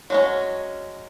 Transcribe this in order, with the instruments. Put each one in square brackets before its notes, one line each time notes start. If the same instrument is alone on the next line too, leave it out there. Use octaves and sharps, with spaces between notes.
[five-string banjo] F#3 G#3 C#4